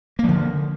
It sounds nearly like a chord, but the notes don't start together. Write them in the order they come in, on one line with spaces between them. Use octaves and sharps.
A#3 F3 D3